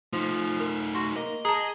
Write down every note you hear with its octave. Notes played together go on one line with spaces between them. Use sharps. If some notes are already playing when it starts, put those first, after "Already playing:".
F3 A3 D#4
A#4
F#4 C6
A#3 D#5
G#4 A5 A#5